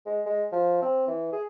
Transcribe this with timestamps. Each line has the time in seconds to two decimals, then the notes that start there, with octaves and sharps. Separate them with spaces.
0.06 G#3
0.26 G#3
0.52 F3
0.82 C4
1.07 E3
1.32 G#4